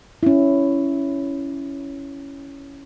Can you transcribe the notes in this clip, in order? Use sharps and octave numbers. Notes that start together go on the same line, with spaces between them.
C#4 E4